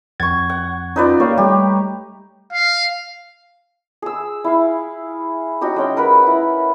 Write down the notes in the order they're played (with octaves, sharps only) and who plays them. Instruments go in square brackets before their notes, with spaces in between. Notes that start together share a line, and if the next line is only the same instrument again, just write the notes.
[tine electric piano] F2 G#6 A6 [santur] F#5 C#6
[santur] F#5
[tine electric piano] C#4 F4 [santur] D#4 B4 D5
[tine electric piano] A#3 G4 F5 [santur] C#5
[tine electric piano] G3 A3 [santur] G4
[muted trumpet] F5
[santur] G#4 E6
E4 F5
D#4 F#4 G4 C#5
G#3 C#4 G5
A#4 B4 F#5 B5
E4 F#5